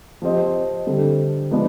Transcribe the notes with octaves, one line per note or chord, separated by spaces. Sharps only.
F3 C4 G4 C5 D#5
D3 G3 C4
F3 G#3 B3 D4